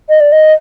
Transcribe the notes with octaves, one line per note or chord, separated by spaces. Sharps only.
D#5
D5
D#5